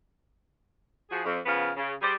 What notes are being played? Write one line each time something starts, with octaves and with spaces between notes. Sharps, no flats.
F3 F#4 G#4
F2
C#3 F3 B3 A#4 F5
C#3
G3 G4 G#4 C5 D5